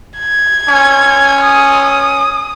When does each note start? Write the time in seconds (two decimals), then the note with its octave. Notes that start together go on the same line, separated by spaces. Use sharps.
0.19 G#6
0.68 C#4
1.45 D#6